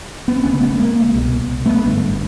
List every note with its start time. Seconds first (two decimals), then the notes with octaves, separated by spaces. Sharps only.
0.28 B3
0.36 C4
0.43 E1 D2 C#3 B3 C#4
0.60 A3 B3
0.73 B3
0.78 G#3 A#3
1.13 C2 B2
1.66 A3 B3
1.84 G#1 G2 D3